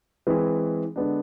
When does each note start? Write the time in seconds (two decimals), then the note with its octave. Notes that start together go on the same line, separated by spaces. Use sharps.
0.27 E3 G#3 C4 G#4 B4
0.96 D3 G#3 B3 D4